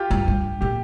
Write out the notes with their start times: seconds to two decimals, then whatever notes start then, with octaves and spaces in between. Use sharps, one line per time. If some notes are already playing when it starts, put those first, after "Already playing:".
Already playing: F4 G4
0.11 G2
0.28 G2
0.61 A#2 G4